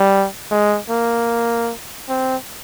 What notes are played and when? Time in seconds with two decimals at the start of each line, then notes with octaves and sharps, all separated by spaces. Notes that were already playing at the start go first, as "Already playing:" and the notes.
Already playing: G3
0.51 G#3
0.90 A#3
2.09 C4